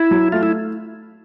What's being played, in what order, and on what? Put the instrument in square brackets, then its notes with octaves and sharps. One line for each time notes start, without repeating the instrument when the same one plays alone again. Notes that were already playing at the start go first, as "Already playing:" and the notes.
Already playing: [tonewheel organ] E4
[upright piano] F#3
[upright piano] A3 [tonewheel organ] F4
[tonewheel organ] E4